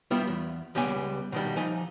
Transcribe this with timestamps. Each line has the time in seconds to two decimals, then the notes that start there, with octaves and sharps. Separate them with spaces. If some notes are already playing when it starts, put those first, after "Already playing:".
0.11 G3 B3 E4 F4 G4
0.27 E2
0.75 C#2 G3 B3 G#5
1.32 B2 D#3 G3
1.56 F3 D#4 G#5